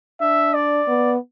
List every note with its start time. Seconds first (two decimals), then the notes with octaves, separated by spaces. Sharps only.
0.21 D4 E5
0.54 D5
0.88 B3